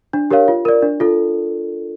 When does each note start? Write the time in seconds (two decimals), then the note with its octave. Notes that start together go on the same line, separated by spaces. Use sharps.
0.13 D4
0.31 G4 A#4 C#5 F5
0.48 F4
0.65 A#4 D5
0.82 D4
1.00 F4 A4